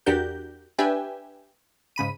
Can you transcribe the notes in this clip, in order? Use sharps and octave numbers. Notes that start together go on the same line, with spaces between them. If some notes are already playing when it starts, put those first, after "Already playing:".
E2 D4 F#4 G4 A#4 G6
D4 G4 B4 E5 G5 G#5
G#2 C#3 B5 D#7